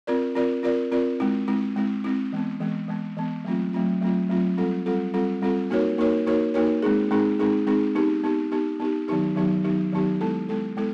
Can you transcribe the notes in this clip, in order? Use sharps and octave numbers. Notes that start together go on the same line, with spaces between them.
C4 F4 A#4 D5
C4 F4 A#4 D5
C4 F4 A#4 D5
C4 F4 A#4 D5
G#3 C4 E4
G#3 C4 E4
G#3 C4 E4
G#3 C4 E4
E3 G#3 B3
E3 G#3 B3
E3 G#3 B3
E3 G#3 B3
F#3 A3 C4 F4
F#3 A3 C4 F4
F#3 A3 C4 F4
F#3 A3 C4 F4
G3 C4 F4 A4
G3 C4 F4 A4
G3 C4 F4 A4
G3 C4 F4 A4
A#3 D#4 F#4 A#4 C#5
A#3 D#4 F#4 A#4 C#5
A#3 D#4 F#4 A#4 C#5
A#3 D#4 F#4 A#4 C#5
G#3 C4 D#4 G#4
G#3 C4 D#4 G#4
G#3 C4 D#4 G#4
G#3 C4 D#4 G#4
B3 D#4 G4
B3 D#4 G4
B3 D#4 G4
B3 D#4 G4
D#3 F#3 B3 D#4 G4
D#3 F#3 B3 D#4 G4
D#3 F#3 B3 D#4 G4
D#3 F#3 B3 D#4 G4
G#3 B3 E4 A4
G#3 B3 E4 A4
G#3 B3 E4 A4